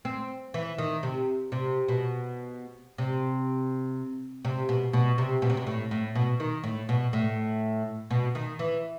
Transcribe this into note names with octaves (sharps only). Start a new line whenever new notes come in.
C4
E3
D#3
C3
C3
B2
C3
C3
B2
B2
C3
B2
C3
B2
A2
A2
B2
D#3
A2
B2
A2
B2
D#3
E3